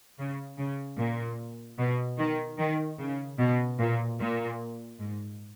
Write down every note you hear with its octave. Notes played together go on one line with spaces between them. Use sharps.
C#3
C#3
A#2
B2
D#3
D#3
C#3
B2
A#2
A#2
G#2